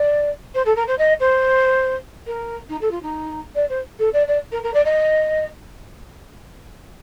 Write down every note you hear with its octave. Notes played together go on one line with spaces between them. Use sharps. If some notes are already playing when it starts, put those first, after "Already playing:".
Already playing: D5
C5
A4
A#4
C5
D#5
C5
A#4
D#4
A4
F4
D#4
D5
C5
A4
D5
D5
A#4
A#4
D5
D#5